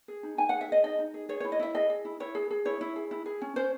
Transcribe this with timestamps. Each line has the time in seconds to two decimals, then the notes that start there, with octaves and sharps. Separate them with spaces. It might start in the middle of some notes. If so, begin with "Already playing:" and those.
0.08 G#4
0.23 D#4
0.38 D#4 G#5
0.49 F#5
0.54 G#4
0.61 E5
0.68 G#4 D#5
0.83 D#4 D#5
0.99 D#4
1.14 G#4
1.29 G#4 C#5
1.40 C#5
1.44 E4
1.52 D#5
1.59 E4 E5
1.75 G#4 D#5
1.90 G#4
2.05 E4
2.20 E4 C#5
2.35 G#4
2.51 G#4
2.65 E4 C#5
2.81 E4
2.96 G#4
3.11 E4
3.26 G#4
3.41 C#4
3.56 C#4 C5